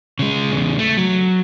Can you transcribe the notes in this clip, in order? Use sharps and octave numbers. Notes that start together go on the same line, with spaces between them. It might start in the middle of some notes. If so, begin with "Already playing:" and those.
C#3 G#3
E2 C#3
A3
F#3